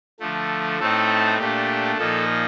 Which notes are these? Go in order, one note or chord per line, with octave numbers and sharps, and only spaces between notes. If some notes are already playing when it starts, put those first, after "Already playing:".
D3 F3 A3
A2 A3 C4 D#4 A4
A#2 A3 D4 G4
A#2 F3 A#3 D#4 A4